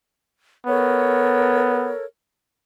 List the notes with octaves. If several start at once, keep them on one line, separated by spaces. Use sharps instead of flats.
B3 A4 A#4 C#5